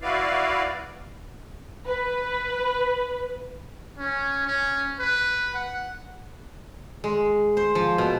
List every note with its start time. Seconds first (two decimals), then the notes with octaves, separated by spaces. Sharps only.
0.01 E4 F#4 B4 D5 F5
1.86 B4
3.98 C#4
4.47 C#4
5.00 B4
5.54 F#5
7.04 G#3
7.57 C5
7.75 F3
7.98 B2